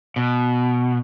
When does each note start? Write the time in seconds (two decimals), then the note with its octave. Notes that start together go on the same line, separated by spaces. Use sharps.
0.16 B2